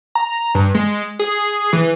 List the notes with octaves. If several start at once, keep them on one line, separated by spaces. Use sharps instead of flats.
A#5
G2
G#3
G#4
E3